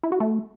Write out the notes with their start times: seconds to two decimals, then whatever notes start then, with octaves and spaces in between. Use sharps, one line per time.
0.03 E4
0.12 F#4
0.20 A3